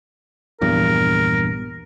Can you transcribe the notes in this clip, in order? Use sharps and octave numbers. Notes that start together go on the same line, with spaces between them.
A#1 E2 G2 A#4